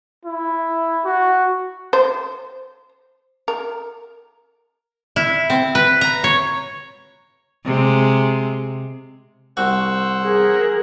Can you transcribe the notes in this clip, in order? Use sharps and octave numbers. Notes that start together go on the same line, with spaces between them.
E4
F#4
C5
A#4
E4
C4
B4
A#5
C#5
C3 G#3
C2 F#4 C5 F#5 E6
G#4 A#4